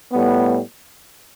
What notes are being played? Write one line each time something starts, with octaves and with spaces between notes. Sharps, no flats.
A2 G3 B3